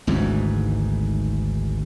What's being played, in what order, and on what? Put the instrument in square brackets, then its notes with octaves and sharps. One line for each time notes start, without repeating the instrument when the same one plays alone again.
[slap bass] G#1 D2 G#2 E3